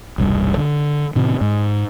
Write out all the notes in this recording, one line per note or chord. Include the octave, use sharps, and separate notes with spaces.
E1 C2 G2
D3
A2 C3 D#3
G#2